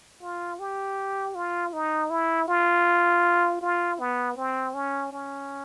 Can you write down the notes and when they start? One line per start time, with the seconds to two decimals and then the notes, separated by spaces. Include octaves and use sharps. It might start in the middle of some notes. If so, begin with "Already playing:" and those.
0.22 F4
0.59 G4
1.35 F4
1.73 D#4
2.10 E4
2.48 F4
3.61 F4
3.99 B3
4.37 C4
4.74 C#4
5.12 C#4